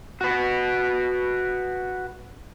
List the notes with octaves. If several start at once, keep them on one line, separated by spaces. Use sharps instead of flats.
F#4 B4